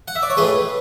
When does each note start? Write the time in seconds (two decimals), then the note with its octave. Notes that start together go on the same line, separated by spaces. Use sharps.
0.08 F#5
0.15 E5
0.23 D5
0.30 C#5
0.37 A2 E3 G#3 B4